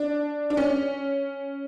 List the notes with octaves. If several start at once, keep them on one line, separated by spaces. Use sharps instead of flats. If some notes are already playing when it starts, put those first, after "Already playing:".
Already playing: D4
D4
C#4